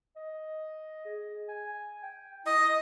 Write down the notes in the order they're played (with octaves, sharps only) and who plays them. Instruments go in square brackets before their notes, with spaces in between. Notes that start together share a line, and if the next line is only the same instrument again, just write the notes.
[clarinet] D#5
G#4
G#5
G5
[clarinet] E4 [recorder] D#5